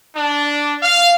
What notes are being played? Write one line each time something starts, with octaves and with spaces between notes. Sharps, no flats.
D4
F5